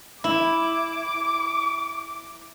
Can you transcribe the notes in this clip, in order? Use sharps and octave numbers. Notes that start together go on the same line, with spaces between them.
E4 D6